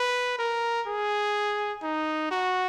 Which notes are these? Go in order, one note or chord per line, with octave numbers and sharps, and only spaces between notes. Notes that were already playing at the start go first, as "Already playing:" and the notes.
Already playing: B4
A#4
G#4
D#4
F#4